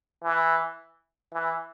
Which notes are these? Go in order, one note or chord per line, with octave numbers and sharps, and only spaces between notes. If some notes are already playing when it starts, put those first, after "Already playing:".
E3
E3